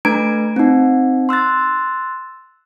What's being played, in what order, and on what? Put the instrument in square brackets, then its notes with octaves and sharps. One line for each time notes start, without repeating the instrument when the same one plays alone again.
[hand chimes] A3 D4 B4 A#5 G#6 D7
C4 D#4
C6 E6 F#6 A6